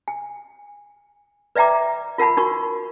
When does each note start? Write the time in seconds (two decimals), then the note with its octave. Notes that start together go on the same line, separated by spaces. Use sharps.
0.08 G#5
1.56 B4 D5 E5 G5 A#5 D6
2.18 F4 A#4 F#5 A5 B5
2.37 D#4 F#4 A#4 C#6